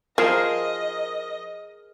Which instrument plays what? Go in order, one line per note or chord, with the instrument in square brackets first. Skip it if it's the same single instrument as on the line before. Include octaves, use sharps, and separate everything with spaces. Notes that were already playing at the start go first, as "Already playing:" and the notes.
[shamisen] F3 [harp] G#4 A#4 C5 [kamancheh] D#5